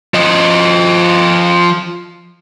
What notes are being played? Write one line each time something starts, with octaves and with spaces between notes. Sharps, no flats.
F3 D#5